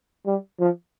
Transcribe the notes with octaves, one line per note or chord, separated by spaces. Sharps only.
G3
F3